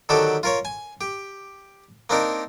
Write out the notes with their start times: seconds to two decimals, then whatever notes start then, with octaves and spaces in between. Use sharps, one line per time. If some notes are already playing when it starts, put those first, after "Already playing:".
0.09 D3 D#3 F#3 F#4 G4 A4
0.43 F4 A#4 C#5
0.65 G#5
1.01 G4
2.10 A#3 C4 D4 D#4 A#4